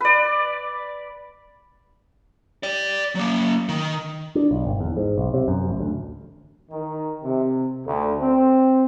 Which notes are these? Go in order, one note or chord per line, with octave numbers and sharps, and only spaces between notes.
B4 D5
D5 G5
F#3 A#3
D#3
D4
B1
G1
E2
G#2
B1
C3
F#2
A1
D2
D#3
C3
D2
C4